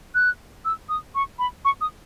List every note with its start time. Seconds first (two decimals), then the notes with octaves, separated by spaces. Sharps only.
0.15 F#6
0.65 E6
0.89 D#6
1.15 C#6
1.39 B5
1.65 C#6
1.81 D#6